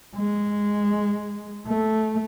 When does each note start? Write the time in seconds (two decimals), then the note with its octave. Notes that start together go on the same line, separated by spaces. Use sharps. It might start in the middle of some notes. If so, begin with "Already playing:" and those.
0.17 G#3
1.67 A3